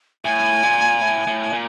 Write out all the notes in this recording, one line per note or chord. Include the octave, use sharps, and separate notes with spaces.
A2 G#5
A#2
A2
A2
A#2